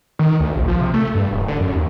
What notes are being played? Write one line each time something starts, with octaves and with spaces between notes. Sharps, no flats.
D#3
D2
A#1
F3
C3
A3
G2
D1
D3
F#2
D#2